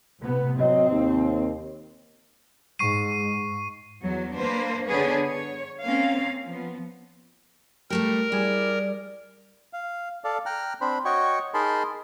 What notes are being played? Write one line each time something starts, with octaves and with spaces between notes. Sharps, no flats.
A2 C3 B3
F#3 C4 D#5
D#2
G#2 C#6 C7 D#7
E2 F#3
A#3 D4 B4 C5
D3 B3 D4 G#4 B4 C#5
C#5
A#3 C4 C#4 F5
F3 B3
G3 A3 G4 A#4
G3 E4 G#4 D5
F5
A4 D5 F5
G5 A#5 F6 F#6
C4 D4 C5 B5
F#4 C#5 D#5 G5 C#6
D#4 G#4 A#4 A5 B5 C6